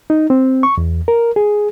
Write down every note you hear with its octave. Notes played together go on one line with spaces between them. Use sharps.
D#4
C4
C#6
E2
A#4
G#4